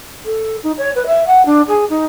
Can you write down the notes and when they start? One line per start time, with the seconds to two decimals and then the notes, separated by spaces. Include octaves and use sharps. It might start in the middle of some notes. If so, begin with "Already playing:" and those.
0.25 A4
0.63 D#4
0.77 C#5
0.95 B4
1.06 E5
1.26 F#5
1.45 D4
1.67 G#4
1.89 D#4